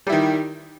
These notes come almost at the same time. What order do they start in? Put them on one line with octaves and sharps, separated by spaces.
G3 E4 D#3